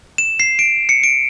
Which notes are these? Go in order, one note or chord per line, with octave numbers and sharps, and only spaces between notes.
E7
C7
D7
C#7
D7